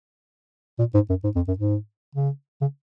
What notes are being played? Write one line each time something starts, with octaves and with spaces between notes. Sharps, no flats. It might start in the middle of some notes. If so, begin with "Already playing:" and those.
A#2
G#2
F#2
G#2
F2
F#2
G#2
C#3
C#3